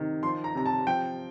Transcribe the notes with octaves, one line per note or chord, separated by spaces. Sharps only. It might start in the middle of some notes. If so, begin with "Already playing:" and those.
Already playing: C3 D#3
F3 C6
A#5
C3 A#5
A5
F3 G5